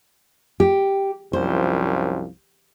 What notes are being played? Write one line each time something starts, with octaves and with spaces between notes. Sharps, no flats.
G4
C2 F#2 F3 C5